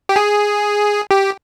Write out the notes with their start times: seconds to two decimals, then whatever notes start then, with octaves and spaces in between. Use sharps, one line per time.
0.09 G4
0.16 G#4
1.11 G4